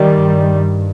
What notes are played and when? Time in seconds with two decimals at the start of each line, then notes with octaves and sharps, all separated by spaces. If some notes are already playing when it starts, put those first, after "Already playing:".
Already playing: D#3 G3
0.11 G2